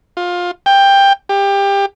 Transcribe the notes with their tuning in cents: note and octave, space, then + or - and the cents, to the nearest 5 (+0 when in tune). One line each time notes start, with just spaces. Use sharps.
F4 +20
G5 +15
G4 +25